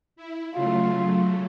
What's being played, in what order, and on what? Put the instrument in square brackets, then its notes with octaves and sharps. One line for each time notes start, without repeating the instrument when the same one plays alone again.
[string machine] E4
[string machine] C#3 F#3 A3 [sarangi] F4